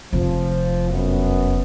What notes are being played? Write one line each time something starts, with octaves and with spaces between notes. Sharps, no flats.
F1 F3
F#2 B3